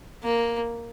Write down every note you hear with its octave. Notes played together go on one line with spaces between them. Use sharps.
A#3